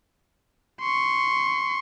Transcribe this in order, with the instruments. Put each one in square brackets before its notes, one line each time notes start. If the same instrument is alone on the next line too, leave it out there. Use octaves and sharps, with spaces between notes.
[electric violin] C6 C#6